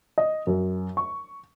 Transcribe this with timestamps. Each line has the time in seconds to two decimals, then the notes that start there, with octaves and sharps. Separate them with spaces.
0.18 D#5
0.47 F#2
0.97 C#6